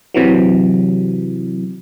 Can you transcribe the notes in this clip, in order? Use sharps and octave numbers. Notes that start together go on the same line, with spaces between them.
C3 E3 F#3